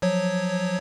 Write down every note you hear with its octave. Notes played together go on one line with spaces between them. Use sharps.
F3 F#3 C#5